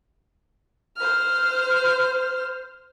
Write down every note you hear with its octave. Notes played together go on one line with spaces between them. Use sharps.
C5 F6